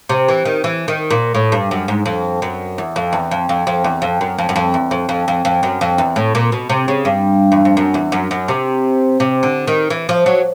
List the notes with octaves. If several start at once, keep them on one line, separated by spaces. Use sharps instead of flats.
C3
E3
D#3
E3
D#3
A#2
A2
G2
F#2
G#2
F2
F#2
E2
F2
E2
F2
F2
F2
E2
F2
F#2
F2
F#2
F2
E2
F2
F2
F2
F2
F#2
F2
E2
A2
A#2
B2
C3
C#3
G2
E2
F2
F#2
E2
F#2
F#2
C3
C3
D3
D#3
E3
F3
F#3